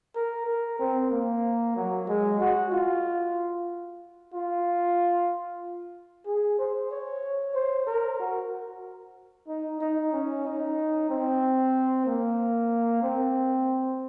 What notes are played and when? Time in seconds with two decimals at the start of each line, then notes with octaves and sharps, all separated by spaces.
0.15 A#4
0.46 A#4
0.79 C4
1.11 A#3
1.76 F#3
2.08 G#3
2.40 F#4
2.72 F4
4.33 F4
6.26 G#4
6.58 C5
6.91 C#5
7.55 C5
7.87 A#4
8.19 F#4
9.48 D#4
9.80 D#4
10.12 C#4
10.45 D#4
11.09 C4
12.06 A#3
13.02 C4